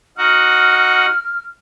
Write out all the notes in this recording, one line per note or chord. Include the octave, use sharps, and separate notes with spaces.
D#4 F#4 F#5 F6